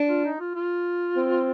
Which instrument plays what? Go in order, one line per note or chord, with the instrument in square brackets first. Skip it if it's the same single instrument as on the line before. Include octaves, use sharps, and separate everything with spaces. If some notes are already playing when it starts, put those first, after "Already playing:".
Already playing: [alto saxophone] D4
[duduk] F4
D#4
F4
F4
[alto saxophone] C4